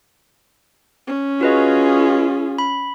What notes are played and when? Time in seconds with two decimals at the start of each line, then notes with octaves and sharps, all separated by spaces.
1.07 C#4
1.41 F4 F#4 G#4 B4 D#5
2.58 B5